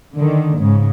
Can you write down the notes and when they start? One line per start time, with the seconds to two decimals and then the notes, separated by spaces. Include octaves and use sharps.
0.15 D3 D#3
0.59 G#2 C#3